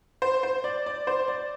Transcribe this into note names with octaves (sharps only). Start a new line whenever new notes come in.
C5
C5
D5
D5
C5
D5